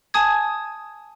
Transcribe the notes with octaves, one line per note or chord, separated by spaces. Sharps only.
G#5 A5 D#6 G#6